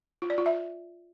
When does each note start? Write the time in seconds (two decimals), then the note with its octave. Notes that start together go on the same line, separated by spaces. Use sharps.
0.22 F4
0.30 D5
0.38 F4
0.46 E5